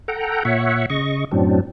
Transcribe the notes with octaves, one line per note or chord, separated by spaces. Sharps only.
A4 F#5 G5 A#5
A#2 C#5 E5 F#5
C#3 D#5 C#6
F#2 A2 F#3 C4 D4